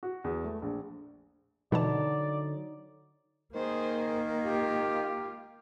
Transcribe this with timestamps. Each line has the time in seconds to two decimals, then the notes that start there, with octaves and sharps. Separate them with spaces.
0.03 F#4
0.24 E2
0.44 A3
0.62 A#1
1.72 B2 D3 E3 F#3 D#4 D5 A5
3.55 D#3 A#3 G#4 C5
4.44 F4 G4